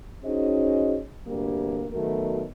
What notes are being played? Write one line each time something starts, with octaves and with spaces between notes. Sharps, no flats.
C#4 D#4 F#4 G#4 C5 D#5
D2 G2 C3 G3 A#3
B2 D#3 F#3 A3 F#4 A#4